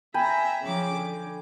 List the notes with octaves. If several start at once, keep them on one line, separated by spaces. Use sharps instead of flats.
E5 G5 G#5 A#5 B5
C#3 F3 D6
D3